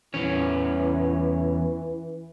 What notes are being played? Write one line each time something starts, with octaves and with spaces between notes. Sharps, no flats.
E2 E3 C#4 C#5